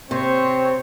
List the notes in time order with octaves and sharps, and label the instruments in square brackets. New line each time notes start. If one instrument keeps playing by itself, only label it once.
[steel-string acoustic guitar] C3 [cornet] C4 [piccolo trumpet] C5 [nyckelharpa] C#5